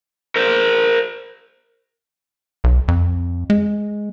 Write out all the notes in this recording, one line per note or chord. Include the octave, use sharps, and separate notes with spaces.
A#4 C5
B1
F2
G#3